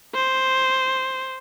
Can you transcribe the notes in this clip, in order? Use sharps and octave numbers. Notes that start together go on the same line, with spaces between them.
C5